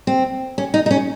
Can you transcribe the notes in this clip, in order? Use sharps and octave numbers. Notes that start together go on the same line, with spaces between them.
C4
C#4
D#4
D#4
C#4